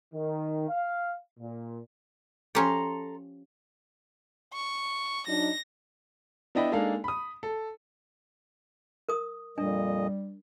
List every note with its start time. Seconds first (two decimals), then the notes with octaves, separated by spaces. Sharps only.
0.14 D#3
0.69 F5
1.40 A#2
2.55 F3 C#4 G4 A4 A#5 C6
4.53 C#6
5.28 F#3 D4 D#4 A#6
6.55 B3 D4 E4 D#5 G5 B5
6.72 G#3 A#3 D4 D#4 A4 F5
7.04 B5 D#6
7.43 A4
9.09 A#4 D#6
9.58 F2 A#2 G3 D4 D#5